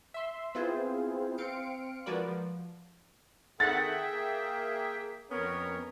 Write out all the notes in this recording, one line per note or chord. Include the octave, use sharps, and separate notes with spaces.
E5 C6
B3 C4 E4 F4 G#4 C5
C4 F5 C6 C#7 D7
F3 G#3 F#4 A#4 B4 D5
F3
D#3 G#4 A4 E5 F#5 G5 A6
A#3
F2 B3 C#4 A#4 C#5